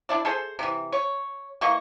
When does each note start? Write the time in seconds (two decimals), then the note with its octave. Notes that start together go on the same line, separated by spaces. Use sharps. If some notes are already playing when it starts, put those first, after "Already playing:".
0.09 D4 E4 D5
0.25 G#4 A4 C5
0.59 C3 E3
0.92 C#5
1.61 E3 A#3 D#5 C#6